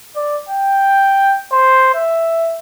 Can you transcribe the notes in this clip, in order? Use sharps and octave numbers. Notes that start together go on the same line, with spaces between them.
D5
G5
C5
E5